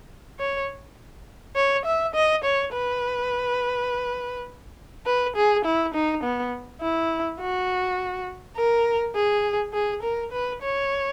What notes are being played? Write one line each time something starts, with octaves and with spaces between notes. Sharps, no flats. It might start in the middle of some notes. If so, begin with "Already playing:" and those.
C#5
C#5
E5
D#5
C#5
B4
B4
G#4
E4
D#4
B3
E4
F#4
A#4
G#4
G#4
A#4
B4
C#5